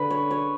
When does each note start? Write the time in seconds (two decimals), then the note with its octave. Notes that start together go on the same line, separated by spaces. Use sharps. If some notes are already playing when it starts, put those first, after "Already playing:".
Already playing: D3 B4
0.10 C#5
0.31 C#5